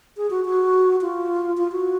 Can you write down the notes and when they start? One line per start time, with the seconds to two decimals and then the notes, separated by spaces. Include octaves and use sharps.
0.17 G#4
0.30 F#4
0.45 F#4
1.01 F4
1.57 F4
1.72 F#4